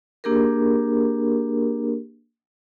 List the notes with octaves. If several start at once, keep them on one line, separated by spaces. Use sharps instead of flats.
A#3 D4 G4 G#4 A#4